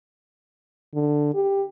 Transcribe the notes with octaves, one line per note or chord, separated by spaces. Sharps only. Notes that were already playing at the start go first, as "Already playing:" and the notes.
D3
G4